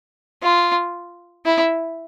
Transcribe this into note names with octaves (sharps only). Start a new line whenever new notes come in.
F4
E4